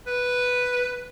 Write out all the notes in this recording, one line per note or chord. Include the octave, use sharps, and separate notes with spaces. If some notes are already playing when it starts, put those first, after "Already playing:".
B4